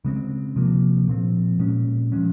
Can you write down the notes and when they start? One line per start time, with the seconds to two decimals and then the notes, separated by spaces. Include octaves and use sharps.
0.05 C#3 G#3 C4
0.56 C3 F3 A#3
1.08 A#2 F3 C4
1.59 A#2 G#3 C#4
2.12 F3 G#3 C#4